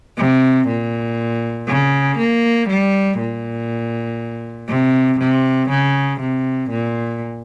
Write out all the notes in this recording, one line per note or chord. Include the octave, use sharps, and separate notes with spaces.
C3
A#2
C#3
A#3
G3
A#2
C3
C3
C#3
C3
A#2